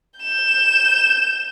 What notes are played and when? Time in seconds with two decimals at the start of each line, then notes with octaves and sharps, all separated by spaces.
0.20 G6 E7